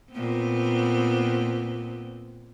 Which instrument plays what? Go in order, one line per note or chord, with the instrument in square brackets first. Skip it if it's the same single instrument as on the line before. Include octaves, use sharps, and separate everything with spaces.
[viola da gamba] A#2 B3 C4